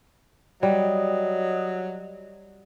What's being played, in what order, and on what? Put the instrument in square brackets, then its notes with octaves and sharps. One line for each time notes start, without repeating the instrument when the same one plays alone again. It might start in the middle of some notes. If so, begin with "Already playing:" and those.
[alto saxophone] F#3 [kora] G3 [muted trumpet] D#5